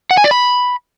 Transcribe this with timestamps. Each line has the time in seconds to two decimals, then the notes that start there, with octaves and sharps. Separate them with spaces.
0.11 F#5
0.17 G#5
0.24 D5
0.31 B5